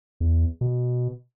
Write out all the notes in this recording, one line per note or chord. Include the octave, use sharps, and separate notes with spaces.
E2
B2